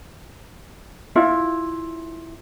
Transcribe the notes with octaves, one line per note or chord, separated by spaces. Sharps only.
E4 F4 E5